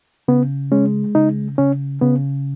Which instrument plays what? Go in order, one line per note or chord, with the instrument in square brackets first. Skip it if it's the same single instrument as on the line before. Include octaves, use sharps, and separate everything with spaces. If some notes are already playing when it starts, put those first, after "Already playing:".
[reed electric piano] C#3 B3
G#3 C#4
C#3 D#4
C#3 C#4
C#3 B3